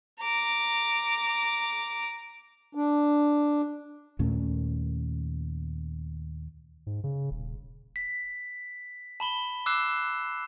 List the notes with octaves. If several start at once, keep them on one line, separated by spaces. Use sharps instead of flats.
A#5 D6
D4
D#2 A#2 A3 C#4
G#2
C#3
D#1
B6
A5 B5 G7
D6 E6 F#6 C7 E7